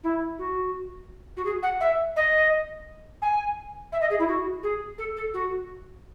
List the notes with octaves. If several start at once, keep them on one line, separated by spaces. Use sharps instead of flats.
E4
F#4
F#4
G#4
F#5
E5
D#5
G#5
E5
D#5
G#4
E4
F#4
G#4
A4
A4
F#4